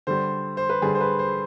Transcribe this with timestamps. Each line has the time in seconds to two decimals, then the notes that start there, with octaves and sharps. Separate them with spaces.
0.07 D3 G3 C5
0.57 C5
0.69 B4
0.82 D3 G3 G#4
0.95 C5
1.00 B4
1.19 C5